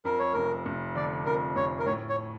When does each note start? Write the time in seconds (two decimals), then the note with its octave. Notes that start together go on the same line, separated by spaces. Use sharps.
0.05 F2 A#4
0.19 C#5
0.33 F1 A#4
0.66 F1
0.95 D3 D5
1.26 F2 A#4
1.56 F1 C#5
1.79 A#4
1.86 A2 C#5
2.09 C#5